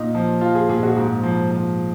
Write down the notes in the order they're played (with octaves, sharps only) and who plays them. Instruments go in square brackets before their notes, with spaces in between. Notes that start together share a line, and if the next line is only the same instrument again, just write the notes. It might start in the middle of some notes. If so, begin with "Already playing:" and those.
Already playing: [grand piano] A#2 D#4
F3
F3 F4
G#4
A#2 G#4
F#4
G#2
F3
F3